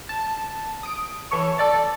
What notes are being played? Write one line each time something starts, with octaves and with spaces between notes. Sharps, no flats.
A5
D#6 D7
E3 A4 C#5 C#6
A4 D5 A6